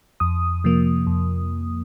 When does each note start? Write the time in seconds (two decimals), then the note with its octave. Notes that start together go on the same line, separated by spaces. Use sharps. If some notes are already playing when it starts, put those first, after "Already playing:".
0.20 F2 D#6
0.64 C3 F3 A#3
1.07 F2